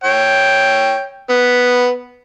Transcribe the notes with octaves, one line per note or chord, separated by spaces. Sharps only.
C#5 G5
B3